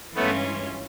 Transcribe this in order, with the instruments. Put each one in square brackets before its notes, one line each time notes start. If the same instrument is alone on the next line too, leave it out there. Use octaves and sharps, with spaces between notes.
[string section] G2 E3 G#3 C#4 F4 [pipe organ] A3 B3